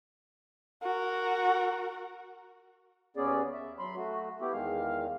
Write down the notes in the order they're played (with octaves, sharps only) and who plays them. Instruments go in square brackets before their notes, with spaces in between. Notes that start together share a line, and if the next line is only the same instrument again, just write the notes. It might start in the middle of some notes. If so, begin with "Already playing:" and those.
[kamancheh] F#4 A#4
[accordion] D#2 B3 C#4 G#4 D5
E5
F#3 B5 C6
A3 F#4
B3 E4 G4
E2 D#3 G#3 F5